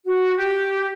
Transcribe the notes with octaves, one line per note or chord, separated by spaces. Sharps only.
F#4
G4